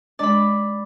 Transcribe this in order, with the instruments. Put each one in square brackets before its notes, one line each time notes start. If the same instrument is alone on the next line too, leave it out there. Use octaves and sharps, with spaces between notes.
[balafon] G#3 D4 D#5 [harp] D5 B5